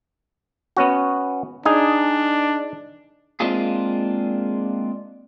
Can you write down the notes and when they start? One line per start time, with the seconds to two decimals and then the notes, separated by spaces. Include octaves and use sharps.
0.77 B3 C#4 F#4
1.65 D4 D#4 G#4
3.40 G#3 A#3 C4 D4 F4 G#4